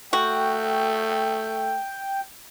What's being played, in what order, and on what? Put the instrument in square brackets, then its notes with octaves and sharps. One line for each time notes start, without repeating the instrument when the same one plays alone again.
[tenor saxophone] A3 [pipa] F#4 [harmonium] G5